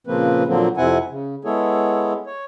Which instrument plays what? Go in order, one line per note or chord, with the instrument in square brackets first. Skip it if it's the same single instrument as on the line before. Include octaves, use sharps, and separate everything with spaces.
[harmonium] A#2 C#3 F3 A#3 C4 B4
A#2 D3 F3 F#3 A#3 C4
F2 C3 C4 E4 F#5 G#5
C#3
G#3 B3 E4 G#4 A4 C#5
C#5